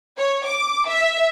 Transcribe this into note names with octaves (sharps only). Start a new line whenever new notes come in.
C#5
D6
E5